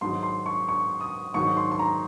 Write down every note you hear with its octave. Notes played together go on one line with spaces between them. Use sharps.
G#2 D#3 F#3 C6
C6
C#6
C#6
D#6
G#2 D#3 F#3 C#6
C6
C6
A#5